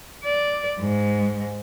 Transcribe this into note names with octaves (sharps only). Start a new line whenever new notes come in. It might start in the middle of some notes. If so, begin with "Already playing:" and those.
D5
G#2